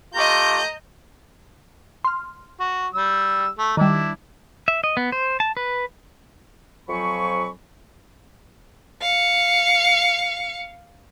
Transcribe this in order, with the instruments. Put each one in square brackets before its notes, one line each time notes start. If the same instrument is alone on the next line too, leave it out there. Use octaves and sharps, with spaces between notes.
[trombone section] A3 F4 G4 [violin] D#5 G6 [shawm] A#5
[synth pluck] C6 F6
[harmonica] F#4
G3 E6
A3
[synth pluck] D#3 G3 [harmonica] D4 E4
[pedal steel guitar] E5
D#5
B3
C5
A5
B4
[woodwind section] F2 F3 F#3 G#5 B5 C#6
[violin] F5 C#7